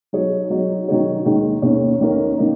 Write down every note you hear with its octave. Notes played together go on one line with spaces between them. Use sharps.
F#3 D#4 G#4 C#5
F#3 D#4 F#4 C#5
D#3 F#3 D#4 G#4 C#5
D#2 D#3 G#3
D#2 D#3 A#3 C#4
D#2 D#3 A#3 C#4 A#4
D#3 A#3 D#4